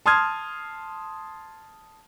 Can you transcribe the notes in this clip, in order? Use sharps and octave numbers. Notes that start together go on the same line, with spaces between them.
A5 C6 D#6 F6 G#6